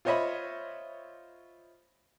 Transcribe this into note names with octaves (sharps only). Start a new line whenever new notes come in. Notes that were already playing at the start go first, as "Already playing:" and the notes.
F4 C5 C#5 D#5 E5 B5